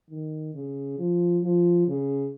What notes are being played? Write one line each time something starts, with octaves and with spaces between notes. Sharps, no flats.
D#3
C#3
F3
F3
C#3